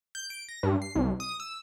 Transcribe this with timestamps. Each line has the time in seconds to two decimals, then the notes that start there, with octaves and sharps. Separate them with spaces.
0.15 G6
0.30 D7
0.48 A#6
0.63 G2
0.82 C7
0.95 C2
1.20 D#6
1.40 E6